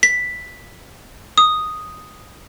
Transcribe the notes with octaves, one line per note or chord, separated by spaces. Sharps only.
B6
D#6